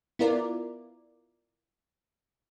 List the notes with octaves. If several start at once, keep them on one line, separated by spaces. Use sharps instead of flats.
B3 E4 F4 A#4 D5